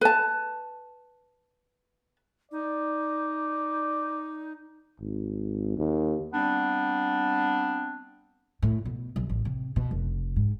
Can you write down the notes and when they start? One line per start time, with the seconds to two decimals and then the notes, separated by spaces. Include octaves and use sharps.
0.01 B4 A5
2.52 D#4 D5
5.00 G#1
5.78 D#2
6.33 G3 B3 C4 D4
8.62 A2
8.85 B2
9.16 B1
9.29 A1
9.45 C3
9.76 B2
9.91 F1
10.36 G#2